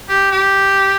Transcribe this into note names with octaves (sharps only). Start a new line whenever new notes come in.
G4
G4